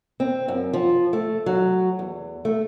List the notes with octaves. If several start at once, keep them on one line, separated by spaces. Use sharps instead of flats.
C4
F#2
F3
A3
F#3
E2
A3